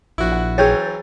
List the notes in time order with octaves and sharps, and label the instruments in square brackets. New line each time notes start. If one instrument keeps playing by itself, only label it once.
[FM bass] A#1 [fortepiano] E4 F#4
[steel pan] F#5
[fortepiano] E3 F#3 [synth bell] G#4 G6 A6 [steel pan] C#5 G5